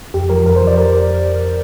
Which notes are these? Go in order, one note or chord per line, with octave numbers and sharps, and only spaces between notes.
F2 G4
F3 A#4
F2 A#4
C5
F3
D5
A#4